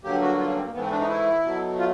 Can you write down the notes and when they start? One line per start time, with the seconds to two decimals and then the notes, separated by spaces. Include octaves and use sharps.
0.04 G2 D3 F#3 A#3 G4
0.21 F#4
0.39 F4
0.48 C#4
0.56 C4
0.65 A#3
0.74 G#2 E3 A3 B3
0.83 C4
0.91 D4
1.00 D#4
1.09 E4
1.44 B2 F#3 A3
1.78 F4